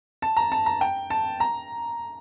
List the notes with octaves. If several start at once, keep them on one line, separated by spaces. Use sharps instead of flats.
A5
A#5
A5
A#5
G5
A5
A#5